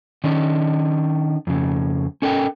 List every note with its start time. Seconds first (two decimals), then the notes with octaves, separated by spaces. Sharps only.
0.24 D#3 C#4 D4
1.47 F2 C#3
2.22 C#4 A4 A#4 G5